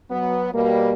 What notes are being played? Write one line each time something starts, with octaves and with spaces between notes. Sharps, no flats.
F#3 B3
B2 G3 A#3